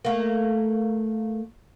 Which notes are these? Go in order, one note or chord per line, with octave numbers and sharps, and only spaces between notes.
A3 A#3